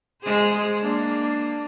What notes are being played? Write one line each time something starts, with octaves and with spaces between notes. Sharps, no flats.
G#3 G#4 C5
A#3 D4